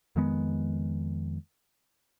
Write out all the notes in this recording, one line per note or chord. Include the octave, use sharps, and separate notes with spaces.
F2 D#3 G#3 B3